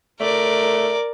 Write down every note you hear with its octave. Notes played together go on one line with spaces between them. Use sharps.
A3 A#4 D5